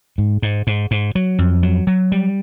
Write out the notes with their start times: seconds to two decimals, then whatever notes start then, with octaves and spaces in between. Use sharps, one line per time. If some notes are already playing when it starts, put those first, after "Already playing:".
0.18 G#2
0.42 G#2
0.67 G#2
0.91 G#2
1.15 F#3
1.39 F2
1.63 F#3
1.87 F#3
2.12 G3